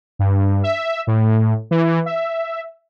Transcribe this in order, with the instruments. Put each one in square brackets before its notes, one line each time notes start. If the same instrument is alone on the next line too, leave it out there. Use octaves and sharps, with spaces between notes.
[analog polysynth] G2
E5
A2
E3
E5